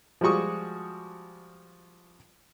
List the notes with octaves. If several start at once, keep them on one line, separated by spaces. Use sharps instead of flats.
F3 G3 G#3 F#4 C#6 D#6